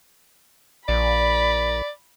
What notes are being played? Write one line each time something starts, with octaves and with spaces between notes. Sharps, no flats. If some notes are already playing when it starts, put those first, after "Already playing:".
A#1 D5 B5